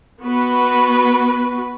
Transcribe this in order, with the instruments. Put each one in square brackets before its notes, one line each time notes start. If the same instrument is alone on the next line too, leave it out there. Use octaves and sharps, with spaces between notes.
[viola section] B3 F#4 B4